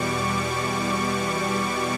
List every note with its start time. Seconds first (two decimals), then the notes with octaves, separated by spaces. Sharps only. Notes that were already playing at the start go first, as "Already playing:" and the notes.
Already playing: E2 B2 G3 C#6 D6